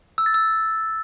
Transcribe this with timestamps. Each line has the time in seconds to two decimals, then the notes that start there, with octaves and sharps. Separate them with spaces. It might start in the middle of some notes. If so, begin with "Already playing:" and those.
0.18 E6
0.26 A6
0.34 E6